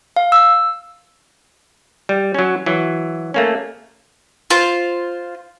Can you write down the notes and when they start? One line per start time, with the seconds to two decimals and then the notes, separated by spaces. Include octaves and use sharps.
0.16 F5
0.32 E6
2.09 G3
2.34 F#3 C#4
2.66 E3 F#3
3.34 A3 A#3 C#4
4.50 F4 C5